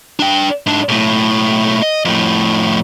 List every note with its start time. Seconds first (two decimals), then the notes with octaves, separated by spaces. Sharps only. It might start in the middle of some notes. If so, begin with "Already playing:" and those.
0.19 D4 G5
0.67 G#2 D4
0.89 B1 A2
1.82 D#5
2.05 F2 A2